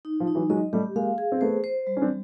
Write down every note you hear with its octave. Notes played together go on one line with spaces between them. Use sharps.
D#4
F3
D#4
E3 F#3
F#3 G#3 D#5
G3 A3 G4
G#3 A#3 F5
G#4
C4
A3 B3 C5
C5
G3
C#4
C4 D4